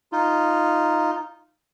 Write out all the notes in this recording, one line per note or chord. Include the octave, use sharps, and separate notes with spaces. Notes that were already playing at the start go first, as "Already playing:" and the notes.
D#4 F4